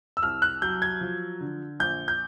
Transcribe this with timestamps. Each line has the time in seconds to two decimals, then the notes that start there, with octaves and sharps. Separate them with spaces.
0.17 E6
0.23 C2 F6
0.42 F#6
0.62 F#3 G6
0.82 G#6
1.01 F3
1.40 D3
1.80 A#1 G6
2.08 G6